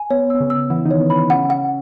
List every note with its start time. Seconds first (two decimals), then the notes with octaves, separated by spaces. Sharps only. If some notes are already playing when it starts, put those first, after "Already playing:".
Already playing: G#5
0.10 B3 C#5
0.30 B3 E6
0.40 C#3 C#4
0.50 E6
0.70 E3 E4 F#5
0.85 D#3 D#4
0.91 C#5
1.00 B3
1.10 B5
1.30 C#3 C#4 F#5
1.50 F#5